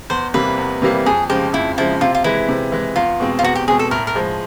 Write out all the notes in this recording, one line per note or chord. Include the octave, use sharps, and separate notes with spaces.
E2 C5
C3 E3 G3 A#3 B4
E2
C3 E3 G3 A#3
F2 G#4
C#3 F3 G#3 G4
F2 E4
C#3 F3 G#3 E4
C3 F4
F4
E3 G#3 E4
C3
E3 G#3
E2 F4
B2 G#3 C4
F4
E2 F#4
G4
B2 G#3 C4 G#4
A4
A2 A#4
A#4
F3 G#3